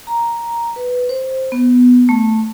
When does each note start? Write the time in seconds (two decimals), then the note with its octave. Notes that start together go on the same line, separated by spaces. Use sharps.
0.07 A#5
0.76 B4
1.09 C5
1.52 B3
2.09 A3